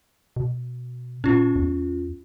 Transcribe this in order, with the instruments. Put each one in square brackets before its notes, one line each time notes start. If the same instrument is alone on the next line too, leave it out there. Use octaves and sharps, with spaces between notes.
[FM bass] B2
[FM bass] A#2 [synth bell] C#4 F4
[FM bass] E2